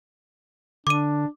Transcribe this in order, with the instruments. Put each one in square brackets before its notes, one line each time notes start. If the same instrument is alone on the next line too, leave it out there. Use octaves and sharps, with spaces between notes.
[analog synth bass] D3 [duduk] D4 [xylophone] D6 D#7